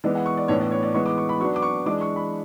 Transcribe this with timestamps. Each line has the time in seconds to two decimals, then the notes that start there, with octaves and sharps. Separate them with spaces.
0.04 E3 G#3 B3 D5
0.15 F#5
0.26 C#6
0.37 D5
0.48 A2 E3 B3 D4 C#5
0.61 D5
0.71 C#5
0.83 D5
0.94 E3 G#3 B3 C#6
1.06 D6
1.18 C#6
1.29 B5
1.40 F#3 B3 D4 C#6
1.56 D6
1.62 C#6
1.86 E3 G#3 D4 D6
2.01 C#6
2.16 B5